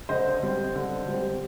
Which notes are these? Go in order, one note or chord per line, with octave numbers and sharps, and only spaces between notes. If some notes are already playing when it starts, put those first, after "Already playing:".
D3 C5 D#5
G3 C4
D3
G3 C4